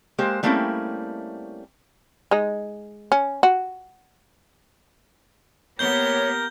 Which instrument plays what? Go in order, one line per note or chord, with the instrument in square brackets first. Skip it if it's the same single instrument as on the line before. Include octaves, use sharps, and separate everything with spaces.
[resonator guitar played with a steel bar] G#3 A#3 G4 C5
G3 A3 A#3 C4 C#4 E4
[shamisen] G#3 D#4
C#4
F#4
[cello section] A#3 B3 G4 [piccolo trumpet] A#4 [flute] C#5 [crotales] G6 G7